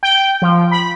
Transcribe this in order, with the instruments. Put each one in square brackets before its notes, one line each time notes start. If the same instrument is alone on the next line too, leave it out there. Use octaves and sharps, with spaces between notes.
[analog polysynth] G5
F3
B5